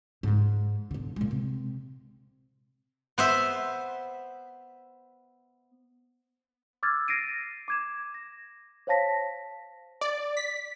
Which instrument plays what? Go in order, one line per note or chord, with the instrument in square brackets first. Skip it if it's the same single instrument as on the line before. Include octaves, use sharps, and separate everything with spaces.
[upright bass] G#2 G#3
B1 D3
A#2 G#3
C3
[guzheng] B3 C5 E5
[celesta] D6 E6 F6 G#6 A6
A#6 C7 D7 D#7
D6 G#6 E7
A#6
C5 C#5 F5 A5 A#6 B6
[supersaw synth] D5
B6